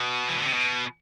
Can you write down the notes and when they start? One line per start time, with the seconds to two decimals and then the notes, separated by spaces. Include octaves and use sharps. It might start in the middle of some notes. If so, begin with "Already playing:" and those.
Already playing: B2
0.28 E3
0.37 D3
0.45 C3
0.53 B2